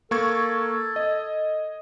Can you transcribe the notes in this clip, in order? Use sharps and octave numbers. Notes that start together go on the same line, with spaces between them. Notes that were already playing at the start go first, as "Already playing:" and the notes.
A#3 A4 C#6 G#6
D#5